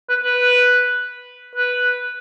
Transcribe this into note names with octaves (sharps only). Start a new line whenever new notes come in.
B4
B4
B4